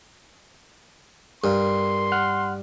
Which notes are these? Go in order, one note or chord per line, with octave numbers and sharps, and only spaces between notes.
G2 A#4 C6
F#5 F6 F#6